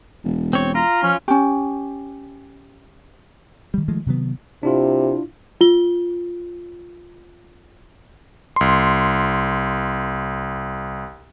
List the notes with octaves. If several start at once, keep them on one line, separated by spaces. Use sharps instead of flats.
E1
C4 C#5
F4 A#5
F3 C#4
C#4 G4
D#3 G3
D#3 F3 G#3 A3
C3 D#3 F#3 B3
C3 D4 E4 F4
F4 G7
C2 C6